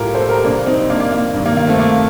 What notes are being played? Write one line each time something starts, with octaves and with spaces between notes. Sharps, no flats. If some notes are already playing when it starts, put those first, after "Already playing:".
Already playing: A2 G3 F4 G4 A4 A#4
A4 C5
G4 A#4
F2 C3 G3 A#3 D4
C4 D#4
A#3 D4
A#3
A#3
G2 D#3 G3
A#3
A#3
A3 C4
A#3